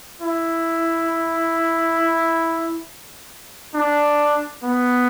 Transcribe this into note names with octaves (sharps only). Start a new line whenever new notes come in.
E4
D4
B3